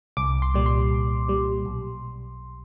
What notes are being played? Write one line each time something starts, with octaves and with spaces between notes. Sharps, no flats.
C2 D6
C6
A#2 G3
C6
C2
A#2 G3
B1